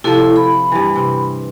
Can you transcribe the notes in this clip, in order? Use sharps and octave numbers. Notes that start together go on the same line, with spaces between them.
C3 F3 E4 A4
B5
G2 E3
C3